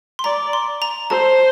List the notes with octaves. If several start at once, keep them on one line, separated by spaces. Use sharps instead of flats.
C6
D5 A#5
C6
A#5
C5 A5